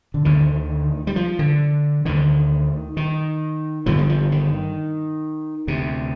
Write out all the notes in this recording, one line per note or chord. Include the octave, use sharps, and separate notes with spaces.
D3
D2 D3 D#3
G3
F3
D3
D2 D3 D#3
D#3
G1 G2 D3 F3
G3
F3
D#3
D2 C3